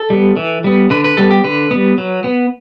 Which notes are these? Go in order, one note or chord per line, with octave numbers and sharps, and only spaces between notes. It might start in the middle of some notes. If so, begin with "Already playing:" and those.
Already playing: A4
G3 B3
E3
G3 B3
D3 B4
B4
G3 B3 A4
G4
D3 B4
G3 B3
F#3
B3